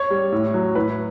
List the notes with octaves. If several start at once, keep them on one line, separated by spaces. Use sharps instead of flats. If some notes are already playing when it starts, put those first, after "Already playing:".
Already playing: C#5
G3
A2
F#3
A2 B4